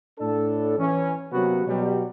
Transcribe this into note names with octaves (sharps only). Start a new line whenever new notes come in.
A2 D4 A4
E3 C#4
C3 F#3 A#3 B3 C#4 F#4
B2 F#3 G3